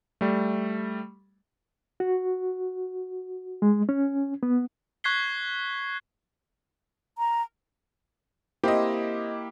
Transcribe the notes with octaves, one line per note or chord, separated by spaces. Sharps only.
G3 A3
F#4
G#3
C#4
B3
C#6 F#6 G#6 B6 C7 G7
A#5
A#3 C4 E4 G4 D#5